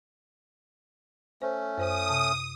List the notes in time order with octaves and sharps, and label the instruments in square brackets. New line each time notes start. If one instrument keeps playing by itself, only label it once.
[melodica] A3 C#4 [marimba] C5
[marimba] F#2 C5 G#5 [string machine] D#6
[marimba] C3 A5